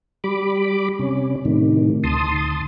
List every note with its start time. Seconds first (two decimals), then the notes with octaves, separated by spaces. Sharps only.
0.24 G3 B5 D6
0.99 C3 C#4
1.45 A2 C3 D#3
2.04 D2 A5 C6 D#6